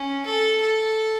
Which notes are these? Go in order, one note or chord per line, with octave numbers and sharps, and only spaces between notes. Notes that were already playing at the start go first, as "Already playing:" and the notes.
Already playing: C#4
A4
A4